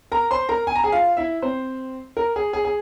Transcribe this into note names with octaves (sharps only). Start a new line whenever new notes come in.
A#4 A#5
C5 C6
A#4 A#5
G#5
A#5
G#4 G#5
F4 F5
E4 E5
C4 C5
A#4
G#4
G#4
G#4